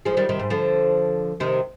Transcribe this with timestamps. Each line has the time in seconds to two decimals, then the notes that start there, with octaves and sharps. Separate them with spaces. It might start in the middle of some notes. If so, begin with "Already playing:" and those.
0.05 F3 G#3
0.17 D#3 G3
0.29 C3 D#3
0.40 G#2
0.50 D3 F3
1.40 C3 D#3